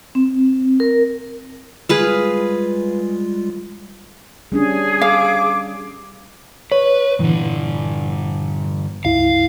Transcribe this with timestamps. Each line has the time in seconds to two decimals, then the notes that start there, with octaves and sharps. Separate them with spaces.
0.15 C4
0.80 A#4
1.89 G3 G#3 F4 G#4 B4 F5
4.52 G3 C#4 D4 G#4
5.01 F5 D6
6.72 B4 C#5
7.19 G2 A#2 D3 E3
9.05 C#2 G2 E4 F5